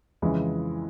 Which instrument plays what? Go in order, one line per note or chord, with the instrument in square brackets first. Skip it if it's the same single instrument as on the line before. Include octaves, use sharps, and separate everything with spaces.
[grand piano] F2 C#3 E3 G#3